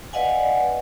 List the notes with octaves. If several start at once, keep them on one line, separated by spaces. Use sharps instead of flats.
B4 D5 D#5 F5 F#5 G#5